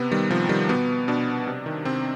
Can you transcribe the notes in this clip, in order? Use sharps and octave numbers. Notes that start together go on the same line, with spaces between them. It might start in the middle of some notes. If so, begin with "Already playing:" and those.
Already playing: C3 B3
D#3 G3
C3 F3
D#3 G3
B2 B3
B2 D4
C3
D#3
C3 C4